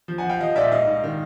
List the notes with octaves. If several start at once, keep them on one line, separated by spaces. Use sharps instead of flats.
F3
F#5 G#5
F3
F5 G5
F3 D#5 F5
A#2 D5 E5
G#2 D#5 F5
G#2
D#3